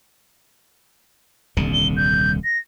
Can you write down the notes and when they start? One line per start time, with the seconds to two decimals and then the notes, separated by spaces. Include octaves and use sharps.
1.57 D#1 C2 D3
1.73 G7
1.97 G6
2.44 A#6